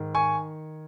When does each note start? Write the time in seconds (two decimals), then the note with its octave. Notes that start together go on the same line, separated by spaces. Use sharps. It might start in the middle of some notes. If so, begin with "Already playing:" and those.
Already playing: G#2 D#3
0.15 G#5 C#6